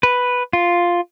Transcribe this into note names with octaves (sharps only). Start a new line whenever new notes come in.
B4
F4